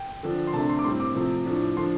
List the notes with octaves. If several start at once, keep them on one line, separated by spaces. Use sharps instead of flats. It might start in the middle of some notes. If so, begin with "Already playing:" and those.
Already playing: G5
D3 F3 D4
C6
C3 A3 D4 A5
C6
D6
A2 G3 C4 C6
D6
C3 F3 A3 C4
A2 F3 D4
D3 F3 D4 C6